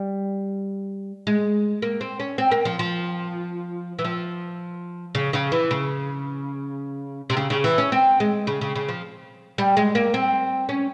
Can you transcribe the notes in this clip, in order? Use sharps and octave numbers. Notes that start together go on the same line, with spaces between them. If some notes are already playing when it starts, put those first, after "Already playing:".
Already playing: G3
G#3
A#3
C4
C#4
C4
A#3
F3
F3
E3
F3
C#3
C#3
E3
C#3
C3
C#3
C#3
E3
C#4
C4
G#3
C#3
C#3
C#3
F3
G3
G#3
A#3
C4
C#4